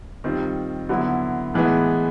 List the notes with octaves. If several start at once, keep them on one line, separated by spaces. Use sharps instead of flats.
D#3 G3 C4 F4
D3 F#3 B3 E4
A2 E3 G#3 B3